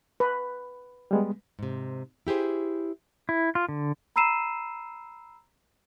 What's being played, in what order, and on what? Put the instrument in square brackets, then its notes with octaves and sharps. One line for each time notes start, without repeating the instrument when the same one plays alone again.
[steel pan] B4
[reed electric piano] G3 G#3 B3
[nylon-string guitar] G#2 C3
E4 G4 G#4 C5
[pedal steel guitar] E4
F4
D3
[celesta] A#5 B5 E6 C7 D#7 E7